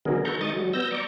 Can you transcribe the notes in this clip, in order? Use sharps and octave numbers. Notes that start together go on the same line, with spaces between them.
D3 D#3 F#3 B3 G#4 A#4
A4 B4 A#5 C#6 G6
D#3 G#3 D#5 C#6 D#6 A6
F#3 G3
B3 E6 G6 A#6
D5 A#5 C#6 D6